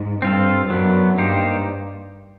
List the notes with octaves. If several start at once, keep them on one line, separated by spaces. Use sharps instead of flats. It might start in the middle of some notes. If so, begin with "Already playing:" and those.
Already playing: G#2
G2 C4 F4 A4
F#2 F#3 B3 D4
G2 A#3 D#4 G4 C5